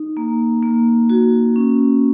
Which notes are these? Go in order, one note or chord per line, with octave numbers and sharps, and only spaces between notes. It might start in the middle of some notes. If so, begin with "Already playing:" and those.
Already playing: D#4
A#3
A#3
F#4
C#4